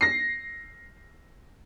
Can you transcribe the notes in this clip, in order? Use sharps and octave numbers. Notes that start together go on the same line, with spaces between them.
A#6 C7